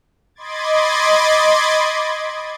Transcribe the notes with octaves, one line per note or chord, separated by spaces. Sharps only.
D#5 B5 C6 D6 G#6 A6